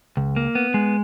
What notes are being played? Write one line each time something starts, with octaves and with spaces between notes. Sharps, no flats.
C#2
A#3
B3
G#3